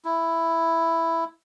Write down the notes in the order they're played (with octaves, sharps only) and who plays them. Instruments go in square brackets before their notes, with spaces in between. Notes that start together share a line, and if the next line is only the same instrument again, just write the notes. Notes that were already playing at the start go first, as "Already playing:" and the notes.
[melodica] E4